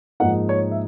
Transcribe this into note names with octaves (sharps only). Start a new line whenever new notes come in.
G#2 F3 A#3 D#4 F#5
C#5
E5